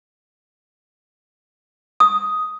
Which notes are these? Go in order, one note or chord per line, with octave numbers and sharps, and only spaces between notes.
D#6